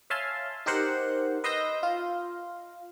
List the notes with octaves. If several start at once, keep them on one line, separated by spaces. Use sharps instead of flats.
C#5 E5 F5 G#5 A5 C6
D#4 G4 A#4 C5 F#5
B4 D#5 C6 E6 G6 A#6
F4 F5